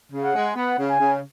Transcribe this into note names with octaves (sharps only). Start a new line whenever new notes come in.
C#3
F#5
G#3
B3 F#5
C#3
G#5
C#3